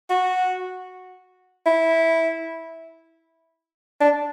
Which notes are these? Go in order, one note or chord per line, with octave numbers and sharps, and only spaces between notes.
F#4
E4
D4